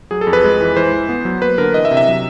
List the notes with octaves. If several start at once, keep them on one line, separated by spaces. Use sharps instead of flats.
F#3 G#4
A4
F2
B4
G#3
E3
E3 C5
E3
B3
F#3
A#3 B4
D3 A#4
E3 D#5
E5
C3
E5
F#3